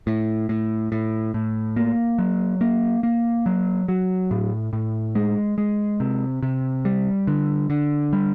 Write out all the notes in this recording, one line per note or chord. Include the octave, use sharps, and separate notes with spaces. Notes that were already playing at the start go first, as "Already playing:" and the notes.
A2
A2
A2
A2
A#3
F#3
A#3
A#3
F#3
F#3
A2
A2
G#3
G#3
C3
C3
G3
D3
D3
G3